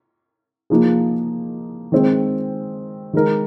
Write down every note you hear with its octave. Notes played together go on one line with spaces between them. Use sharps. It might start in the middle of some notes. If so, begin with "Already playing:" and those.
F3 A#3 D#4 G#4
D#3 G#3 C4
D#3 G#3 D#4 A#4